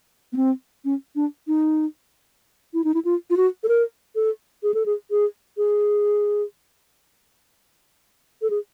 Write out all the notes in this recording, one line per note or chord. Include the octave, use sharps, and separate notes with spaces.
B3
C4
C#4
D4
D#4
E4
D#4
E4
F4
F4
F#4
A4
A#4
A4
G#4
A4
G#4
G#4
G#4
A4
G#4